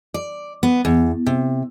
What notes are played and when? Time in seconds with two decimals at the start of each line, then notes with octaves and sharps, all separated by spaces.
0.14 D5
0.63 B3
0.85 E2
1.26 C3